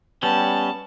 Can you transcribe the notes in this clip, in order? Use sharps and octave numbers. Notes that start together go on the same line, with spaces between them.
G3 B3 C#4 A5